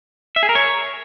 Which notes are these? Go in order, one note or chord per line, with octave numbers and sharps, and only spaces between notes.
E5
G#4
A#4
C#5